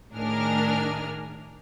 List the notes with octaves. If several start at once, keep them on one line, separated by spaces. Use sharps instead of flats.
A2 D#3 D4 G#4 A#4 F6